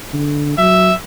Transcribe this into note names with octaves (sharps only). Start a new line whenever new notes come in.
D3
F#3 E5